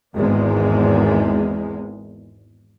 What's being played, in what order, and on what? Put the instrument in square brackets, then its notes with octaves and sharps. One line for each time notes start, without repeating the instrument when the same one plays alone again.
[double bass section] G#1 E2 G#2 G#3